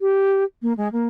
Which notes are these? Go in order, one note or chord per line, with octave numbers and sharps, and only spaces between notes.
G4
A#3
G#3
A#3